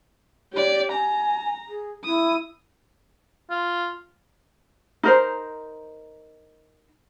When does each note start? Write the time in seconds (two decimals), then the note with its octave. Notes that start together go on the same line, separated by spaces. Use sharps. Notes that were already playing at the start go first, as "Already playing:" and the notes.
0.53 G4 C#5 D5
0.92 G#5 A#5
1.67 G#4
2.05 E4 D#6
3.50 F4
5.03 D#4 A#4 C5